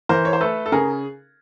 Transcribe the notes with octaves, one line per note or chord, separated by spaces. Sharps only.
E3 A#4 C5
C#5
C5
A3 A4 B4
A4
C#3 G#4 A#4